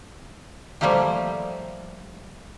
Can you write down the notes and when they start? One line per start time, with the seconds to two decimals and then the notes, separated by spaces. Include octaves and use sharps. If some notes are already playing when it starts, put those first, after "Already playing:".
0.81 F3 G3 A3 A#3 E4 G4